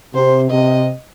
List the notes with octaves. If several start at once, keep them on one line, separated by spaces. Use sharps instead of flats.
C3 C5
C3 D#5